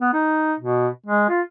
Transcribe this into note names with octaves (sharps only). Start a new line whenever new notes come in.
B3
D#4
B2
G#3
F4